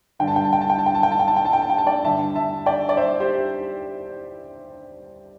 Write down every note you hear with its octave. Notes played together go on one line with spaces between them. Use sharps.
G2 D3 G5
A5
G5
A5
G5
A5
G5
A5
G5
A5
G5
A5
G5
A5
G5
A5
G5
A5
G5
A5
D5 G5
G2 D3 E5 A5
E5 A5
D5 G5
D5
C5 E5
G4 C5